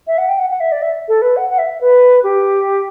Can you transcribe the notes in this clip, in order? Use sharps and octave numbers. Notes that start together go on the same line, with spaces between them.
E5
F#5
G5
F#5
F#5
E5
D5
E5
A4
B4
F#5
F#5
E5
B4
G4